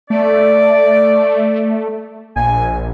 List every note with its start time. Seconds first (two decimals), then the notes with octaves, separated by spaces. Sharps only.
0.10 A3 D5
2.36 A#1 G#5